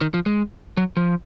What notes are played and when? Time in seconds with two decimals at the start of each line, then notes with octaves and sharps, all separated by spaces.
0.01 D#3
0.14 F3
0.26 G#3
0.77 F#3
0.97 F3